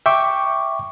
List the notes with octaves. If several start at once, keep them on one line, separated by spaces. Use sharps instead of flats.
E5 G5 C#6 D6